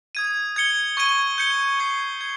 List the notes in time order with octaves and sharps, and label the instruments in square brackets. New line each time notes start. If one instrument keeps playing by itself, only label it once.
[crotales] D#6 G#6 D#7
G#6 C#7 G7
C#6 G#6 D#7 G7
G6 C#7 G7
G#6 C7 G7
G#6